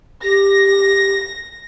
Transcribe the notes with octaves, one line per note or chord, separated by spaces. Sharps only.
G4 A#6